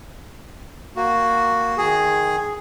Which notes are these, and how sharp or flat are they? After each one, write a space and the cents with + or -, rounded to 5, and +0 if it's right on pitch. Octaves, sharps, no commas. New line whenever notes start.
A#3 +0 F#4 +0
D#3 +0 G#4 +0